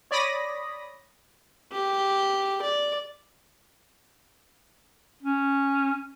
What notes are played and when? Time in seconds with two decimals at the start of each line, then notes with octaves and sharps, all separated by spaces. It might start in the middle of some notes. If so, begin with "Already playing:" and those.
0.11 C#5 D5 B5 D#6 A#6
1.72 G4
2.62 D5
5.23 C#4